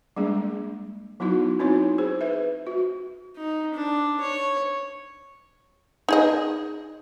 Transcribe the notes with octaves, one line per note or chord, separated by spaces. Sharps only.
G3 G#3 A#3 D4 G#4
F#3 B3 D#4 E4 F#4
C4 D#4 E4 F#4 C#5
G#4 C5
B4 E5
F#4
D#4
D4
C#5
D#4 G#4 D#5